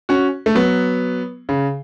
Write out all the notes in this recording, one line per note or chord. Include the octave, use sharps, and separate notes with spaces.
C#4 F#4
A3
F#3 B3
C#3